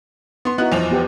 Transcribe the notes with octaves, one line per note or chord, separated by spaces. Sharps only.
B3 C6
B3 D#4 E4 F#4 F#6
E2 F3 F7
B3 G4